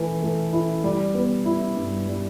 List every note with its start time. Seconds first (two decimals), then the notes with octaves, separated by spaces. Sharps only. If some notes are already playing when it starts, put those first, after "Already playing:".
Already playing: E3 A3 E4
0.22 A3
0.53 E4
0.84 G3
1.14 B3
1.45 E4
1.77 G2
2.08 G3